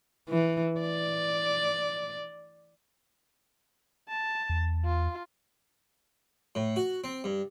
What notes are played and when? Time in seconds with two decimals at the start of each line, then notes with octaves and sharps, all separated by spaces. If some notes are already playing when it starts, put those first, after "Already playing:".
0.29 E3
0.80 D5
4.08 A5
4.50 E2
4.85 F4
6.55 A2
6.76 F#4
7.04 C4
7.24 G2